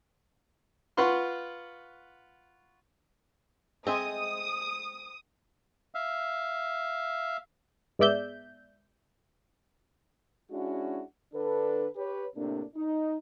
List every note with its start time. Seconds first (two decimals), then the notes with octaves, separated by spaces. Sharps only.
0.97 F4 B4 F#5 C6 C#6
3.87 G#3 C4 E5 G#5 D#6
5.95 E5 F5
7.99 G#2 G#3 B3 D5 E5 G6
10.51 G#3 C#4 D4 E4 F#4
11.34 D3 D4 A4 B4
11.96 G4 B4 C#5
12.36 A2 C3 A#3 D4
12.76 D#4